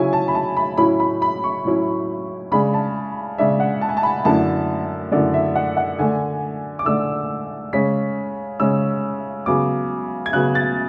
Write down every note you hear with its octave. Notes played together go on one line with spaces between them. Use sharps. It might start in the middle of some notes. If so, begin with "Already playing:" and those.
Already playing: C#3 F#3 C#4 E4 G#5
A5
B5
A5
B5
A2 F#3 C#4 E4 B5
B5
B5
C#6
A2 F#3 C#4 E4
C#3 G#3 D4 B5
A5
C#3 G#3 D4 E5
F#5
A5
G#5
A5
B5
F#2 D3 A3 E4 A5
F#2 D3 A3 E4 D5
E5
F#5
F#5
D3 A3 D4 G#5
D6
D3 A3 D4 E6
C#3 G#3 C#4 B6
C#3 G#3 C#4 E6
C#3 F#3 B3 D6
G#6
C#3 F#3 B3 F#6
A6